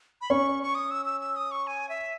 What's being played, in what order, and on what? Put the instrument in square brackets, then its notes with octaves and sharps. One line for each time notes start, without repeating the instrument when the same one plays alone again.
[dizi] B5
[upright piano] C#4 [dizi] C#6
[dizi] C#6
D#6
E6
E6
E6
D#6
C#6
G#5
E5